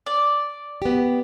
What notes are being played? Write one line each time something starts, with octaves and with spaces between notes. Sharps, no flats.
D5
B3 G4